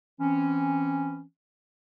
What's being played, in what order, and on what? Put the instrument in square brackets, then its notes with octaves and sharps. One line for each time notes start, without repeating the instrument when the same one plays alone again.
[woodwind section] E3 C4 C#4